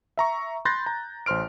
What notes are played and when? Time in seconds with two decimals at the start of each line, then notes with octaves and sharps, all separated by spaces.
0.17 E5 A#5 C#6
0.65 B5 C6 F#6 G6 A6 A#6
0.86 A#5
1.26 A1 C5 C6 F6 D7